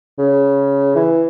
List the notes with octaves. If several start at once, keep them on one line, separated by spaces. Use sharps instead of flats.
C#3
E3